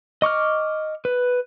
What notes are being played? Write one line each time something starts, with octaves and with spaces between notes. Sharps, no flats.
D#5 C#6 D6 F6
B4